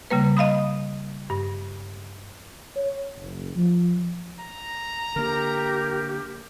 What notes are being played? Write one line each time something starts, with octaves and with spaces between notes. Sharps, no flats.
C#3 G3 A#3 B4
D#5 F5 B5 D#6
G2
C#5
F#1
F3
A#5
D3 A#3 G4 A#4